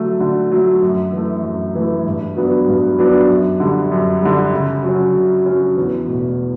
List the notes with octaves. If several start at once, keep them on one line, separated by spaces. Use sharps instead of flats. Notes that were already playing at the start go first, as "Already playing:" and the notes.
Already playing: D3 F#3 A3
D3
F#3 A3
F#2
E3 A3
F#2
E3 A3
G2
F#3 B3 D4
G2
F#3 B3 D4
F#2
D3 G3
F#2
D3 G3
C#3
F#3 C#4
C#3
F#3 C#4
E2
B2 A3